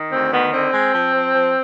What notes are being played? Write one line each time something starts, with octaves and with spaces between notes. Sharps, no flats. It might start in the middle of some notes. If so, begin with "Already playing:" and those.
Already playing: D#3
D2 C4
D#3 B3
D3 C4
G#3
F3
F3
F3